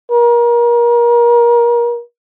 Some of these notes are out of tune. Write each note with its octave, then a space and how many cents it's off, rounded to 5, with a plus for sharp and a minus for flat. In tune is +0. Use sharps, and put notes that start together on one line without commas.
A#4 +30